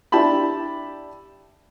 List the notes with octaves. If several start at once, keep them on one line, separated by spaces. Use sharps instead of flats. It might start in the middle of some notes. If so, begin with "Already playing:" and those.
D4 E4 G4 A5 B5